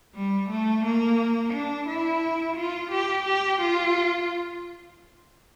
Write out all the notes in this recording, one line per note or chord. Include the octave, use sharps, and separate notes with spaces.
G3
A3
A#3
D4
E4
F4
G4
G4
F4